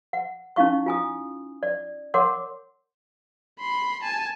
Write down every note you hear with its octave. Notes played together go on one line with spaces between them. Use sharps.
F#5
C#4 D#4 E4 F5 C#6
F4 G#5 D#6
D5
A#4 C#5 F#5 C6 D6
B5 C6
G#5 A5